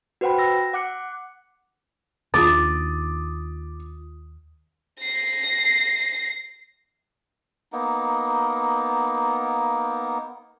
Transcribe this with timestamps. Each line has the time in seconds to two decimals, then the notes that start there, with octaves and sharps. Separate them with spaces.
0.21 F#4 B4 C5 F#5 G5 B5
0.38 E6 A#6
0.73 F#5 D6 F#6 C#7
2.34 D#2 D#3 D4 F4 D6 D#6 A6
5.01 A#6 C7
7.72 A#3 B3 D#4